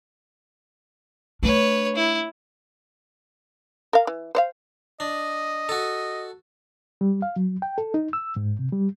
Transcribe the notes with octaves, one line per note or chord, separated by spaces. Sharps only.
A3 D4 B4 C#5
E4
A#4 F5
E3
C5 C#5 F5
D4 D#5
F#4 A4
G3
F5
F#3
G5
A4
D#4
E6
G#2
C3
G3